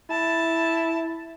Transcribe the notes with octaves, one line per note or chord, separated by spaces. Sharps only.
E4 A5